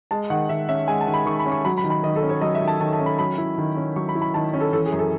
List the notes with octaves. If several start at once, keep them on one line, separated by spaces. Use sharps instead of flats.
G#3 A5
D#3 F#5
D#3 E5
C#4 E5
G#3 G#5
A5
D#3
B5
D#3 C#6
B5
C#4
C#6
F#3 B5
B5
D#3
B5
D#3 D#5
A4
C#4
C#5
F#3 D#5
E5
D#3
A5
D#3 A5
A5
C#4
B5
F#3 B5
E4
D#3
C#4
F#3 C#6
B5
E4
B5
D#3 A5
C#4
A4
E3 A4
G#4
F#2
A4